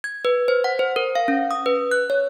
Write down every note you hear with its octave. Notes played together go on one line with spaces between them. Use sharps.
G#6
B4
C5
F#5
C5
A#4
F5
C#4
D#6
B4
F#6
C#5